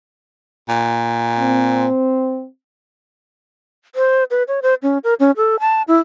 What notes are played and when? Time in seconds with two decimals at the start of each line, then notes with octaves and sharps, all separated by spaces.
0.69 A#2
1.39 C4
3.95 C5
4.31 B4
4.48 C#5
4.62 C5
4.83 C#4
5.04 A#4
5.20 C#4
5.37 A4
5.60 A5
5.88 E4